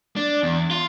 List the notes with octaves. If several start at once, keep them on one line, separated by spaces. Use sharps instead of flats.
D4
E2
F4